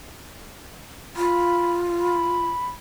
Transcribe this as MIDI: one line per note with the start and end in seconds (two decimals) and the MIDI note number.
1.16 2.47 65
1.16 1.73 83
2.00 2.67 83